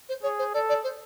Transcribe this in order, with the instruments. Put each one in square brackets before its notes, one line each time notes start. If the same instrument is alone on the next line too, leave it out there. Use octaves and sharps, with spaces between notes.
[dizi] C5
[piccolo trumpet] G#4 [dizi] C#5
[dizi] C5
[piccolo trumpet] A4 [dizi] D5
[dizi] D5
C5